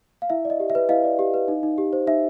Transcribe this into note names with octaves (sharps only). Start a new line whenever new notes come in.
F5
E4 E5
D5
D#5
G4
E5
B4
E4 D#5 F5
D5
G4
B4
D#4
D#4
G4
C5
D#4 E5